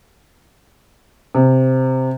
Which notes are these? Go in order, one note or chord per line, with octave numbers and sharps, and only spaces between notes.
C3